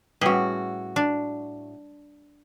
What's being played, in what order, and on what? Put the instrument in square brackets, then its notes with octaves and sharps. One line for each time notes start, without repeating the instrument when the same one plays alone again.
[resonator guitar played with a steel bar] A2 F#4 [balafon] G3 B4 G5 [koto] C#4 G#4
[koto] D4